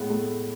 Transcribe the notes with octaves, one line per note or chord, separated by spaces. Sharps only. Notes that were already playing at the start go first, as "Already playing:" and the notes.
Already playing: A2 G#3 B3
A3